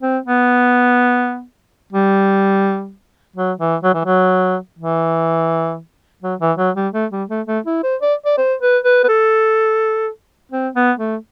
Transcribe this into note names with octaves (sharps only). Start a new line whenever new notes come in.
C4
B3
G3
F#3
E3
F#3
E3
F#3
E3
F#3
E3
F#3
G3
A3
G3
A3
A3
E4
C5
D5
D5
C5
B4
B4
B4
A4
C4
B3
A3